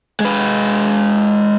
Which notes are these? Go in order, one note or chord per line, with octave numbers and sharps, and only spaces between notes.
G#3 B4